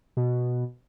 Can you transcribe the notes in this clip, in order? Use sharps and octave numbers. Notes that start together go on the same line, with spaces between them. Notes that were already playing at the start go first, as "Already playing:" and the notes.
B2